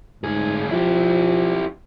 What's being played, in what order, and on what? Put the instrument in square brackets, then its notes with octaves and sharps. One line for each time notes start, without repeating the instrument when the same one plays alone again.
[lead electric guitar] D2 G#4 [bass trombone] G#2
[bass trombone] F3 [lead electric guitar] E4 G4